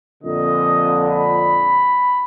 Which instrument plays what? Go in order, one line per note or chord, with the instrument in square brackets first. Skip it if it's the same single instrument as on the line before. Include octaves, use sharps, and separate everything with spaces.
[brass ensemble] F2 A#2 D3 [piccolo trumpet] D#5
[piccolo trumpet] B5